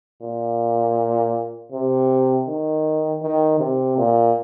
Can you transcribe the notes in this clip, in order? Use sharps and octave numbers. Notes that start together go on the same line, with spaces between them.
A#2
C3
D#3
D#3
C3
A#2